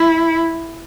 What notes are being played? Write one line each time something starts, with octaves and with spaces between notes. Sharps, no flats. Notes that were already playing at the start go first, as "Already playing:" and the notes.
Already playing: E4